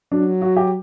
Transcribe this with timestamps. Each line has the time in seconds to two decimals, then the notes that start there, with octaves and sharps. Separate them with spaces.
0.12 F#3 D4
0.42 F#4
0.56 G4